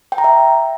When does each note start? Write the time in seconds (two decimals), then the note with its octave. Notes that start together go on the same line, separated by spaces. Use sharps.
0.12 G5
0.18 A#5
0.24 E5